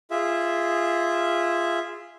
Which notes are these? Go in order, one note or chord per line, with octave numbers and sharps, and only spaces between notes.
F4 G#4 E5